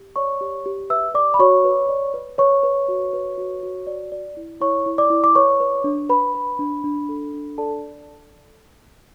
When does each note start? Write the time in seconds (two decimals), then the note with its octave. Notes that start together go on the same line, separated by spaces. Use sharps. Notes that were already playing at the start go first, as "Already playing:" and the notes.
Already playing: G4
0.16 C#5 D5 C#6
0.41 G4
0.66 G4
0.90 B4 E5 E6
1.15 D5 D6
1.34 B5
1.39 F#4 C#5 C#6
1.64 B4
1.89 D5
2.14 B4
2.38 B4 C#5 C#6
2.63 B4
2.88 F#4
3.13 B4
3.38 F#4
3.63 F#4
3.87 D5
4.12 D5
4.37 E4
4.61 E4 C#5 C#6
4.86 E4
4.98 D5 D6
5.10 E4
5.24 D6
5.35 B4 C#5 C#6
5.60 B4
5.84 D4
6.09 B4 B5
6.34 B4
6.59 D4
6.84 D4
7.09 A4
7.34 D4
7.58 A4 D5 A5